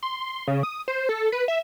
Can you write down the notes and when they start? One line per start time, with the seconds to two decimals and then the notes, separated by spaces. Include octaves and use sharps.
0.03 C6
0.48 C#3
0.63 D#6
0.88 C5
1.09 A4
1.32 B4
1.48 E5